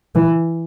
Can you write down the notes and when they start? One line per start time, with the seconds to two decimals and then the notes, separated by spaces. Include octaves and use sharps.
0.15 E3